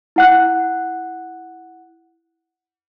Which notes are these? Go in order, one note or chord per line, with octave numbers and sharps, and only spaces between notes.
E4 F#5 F#6